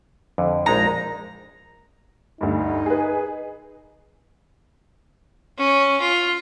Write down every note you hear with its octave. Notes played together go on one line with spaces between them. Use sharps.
F2 D3
A#1 G#3 D#4 A#5
D2 G2 D#4
G#4 B4
C#4
F4